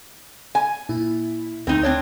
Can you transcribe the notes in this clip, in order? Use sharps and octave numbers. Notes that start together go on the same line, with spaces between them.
G#5
A#2 E4 E5
D2 C4 D#4 B4
C4 D4 C#5